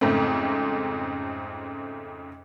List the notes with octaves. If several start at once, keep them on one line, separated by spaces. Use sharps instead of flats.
F2 G#2 C#3 A3 C4